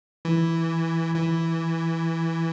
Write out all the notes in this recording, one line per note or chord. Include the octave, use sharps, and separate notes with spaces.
E3
E3